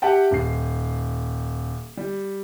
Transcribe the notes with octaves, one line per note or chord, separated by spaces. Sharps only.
G4 E5 F#5 G5 A5
D#1 C7
G3